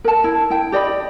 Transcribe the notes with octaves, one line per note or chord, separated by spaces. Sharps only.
A#4 A5
E4
E4 G5
G4 D5 D#5 B5